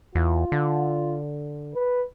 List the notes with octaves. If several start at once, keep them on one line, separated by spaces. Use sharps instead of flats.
E2 F4
D3
B4